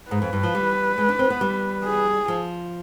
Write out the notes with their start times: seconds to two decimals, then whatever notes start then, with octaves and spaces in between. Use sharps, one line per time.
0.11 G#2 B4
0.22 F2
0.33 G2
0.43 F3
0.55 G3
0.98 G#3
1.09 D4
1.19 C4
1.30 B3
1.41 G3
1.84 G#4
2.28 F3